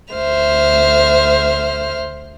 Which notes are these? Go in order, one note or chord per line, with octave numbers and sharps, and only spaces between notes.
D2 C5 E5 F6